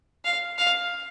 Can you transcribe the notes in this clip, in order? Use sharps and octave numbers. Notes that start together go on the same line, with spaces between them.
F5
F5